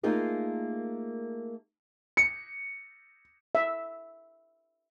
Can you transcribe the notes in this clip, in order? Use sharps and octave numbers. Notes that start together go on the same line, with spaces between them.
A3 A#3 D#4 F4 G#4 A#4
C#7
E5